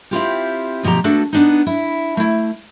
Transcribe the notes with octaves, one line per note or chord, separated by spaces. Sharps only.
C4 E4 F4 G4
D2 B2 F3 G4 A#5
A3 B3 D4 F#4 A4
B3 D4 D#4
E4
A3 E4